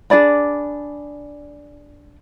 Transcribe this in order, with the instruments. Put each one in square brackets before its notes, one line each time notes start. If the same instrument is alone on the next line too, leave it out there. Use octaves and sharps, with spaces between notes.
[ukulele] D4 G#4 D5 B5